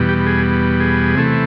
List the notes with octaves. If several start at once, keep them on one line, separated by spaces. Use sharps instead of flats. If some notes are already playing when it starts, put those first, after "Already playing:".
Already playing: E2 B2 G3
G4
G#4
G#4
C3 E3 A3